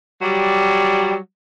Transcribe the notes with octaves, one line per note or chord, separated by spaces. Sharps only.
F#3 G3